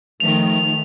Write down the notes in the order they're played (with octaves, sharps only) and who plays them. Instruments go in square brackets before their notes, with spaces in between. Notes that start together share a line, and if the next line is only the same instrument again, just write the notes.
[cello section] D#3 F3 A3 [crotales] F7